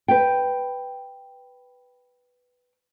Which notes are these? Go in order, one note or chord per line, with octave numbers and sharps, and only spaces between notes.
B4 G5